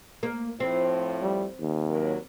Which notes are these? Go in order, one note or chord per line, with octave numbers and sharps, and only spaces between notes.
A#3
A2 F3 C4
G3
D#2
G2 F#3 A#4